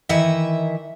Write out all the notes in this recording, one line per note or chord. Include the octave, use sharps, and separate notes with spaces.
D#3 E3 E4 D#5 E5